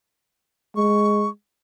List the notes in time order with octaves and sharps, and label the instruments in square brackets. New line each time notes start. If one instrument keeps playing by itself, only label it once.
[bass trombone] G#3 [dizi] C#6